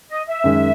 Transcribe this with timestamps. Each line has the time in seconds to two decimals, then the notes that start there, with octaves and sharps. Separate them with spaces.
0.10 D#5
0.28 E5
0.44 F#2 D#3 G#3